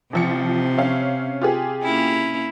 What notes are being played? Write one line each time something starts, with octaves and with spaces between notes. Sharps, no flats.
A1 C3 F3 C#7
C#4 E5 F5
F4 G4 G#4
A#3 C#4 E4